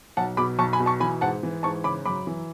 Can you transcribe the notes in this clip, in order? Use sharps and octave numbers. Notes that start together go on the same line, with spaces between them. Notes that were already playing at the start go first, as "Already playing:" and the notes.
B1 F#5 A5
B2 B5 D6
B1 A5 C#6
G#5 B5
B2
A5 C#6
E3 G#5 B5
G#2 F#5 A5
E3
G#2 A5 C#6
C#3 B5 D6
F#2 B5 D6
E3